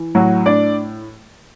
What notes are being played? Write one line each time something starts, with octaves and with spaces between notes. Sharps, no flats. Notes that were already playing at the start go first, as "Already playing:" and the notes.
Already playing: E3
A2 F#3 F#4
A2 D4 D5